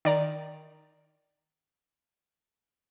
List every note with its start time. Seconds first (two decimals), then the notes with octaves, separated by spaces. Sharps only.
0.05 D#3 D5 A#5